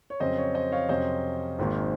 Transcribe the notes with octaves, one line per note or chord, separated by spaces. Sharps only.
C#5
F2 C#3 F#3 C4 C5 D#5
C#5
C5 D#5
C#5 F5
F2 C3 F#3 C#4 C5 D#5
G#1 G#2 D#3 A#3